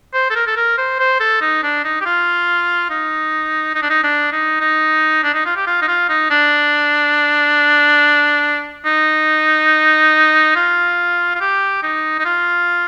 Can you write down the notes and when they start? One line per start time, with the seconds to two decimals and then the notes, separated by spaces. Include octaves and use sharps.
0.14 C5
0.30 A4
0.36 A#4
0.47 A4
0.56 A#4
0.78 C5
0.99 C5
1.20 A4
1.41 D#4
1.63 D4
1.84 D#4
2.01 G4
2.05 F4
2.90 D#4
3.75 D#4
3.83 D4
3.90 D#4
4.04 D4
4.32 D#4
4.60 D#4
5.24 D4
5.34 D#4
5.45 F4
5.56 G4
5.67 F4
5.82 D#4
5.88 F4
6.09 D#4
6.30 D4
8.85 D#4
10.56 F4
11.35 F4
11.41 G4
11.83 D#4
12.19 D#4
12.25 F4